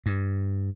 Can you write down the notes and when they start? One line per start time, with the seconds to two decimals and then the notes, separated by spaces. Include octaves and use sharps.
0.06 G2